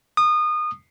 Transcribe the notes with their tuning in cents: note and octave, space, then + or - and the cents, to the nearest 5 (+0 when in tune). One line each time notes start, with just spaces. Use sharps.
D#6 -25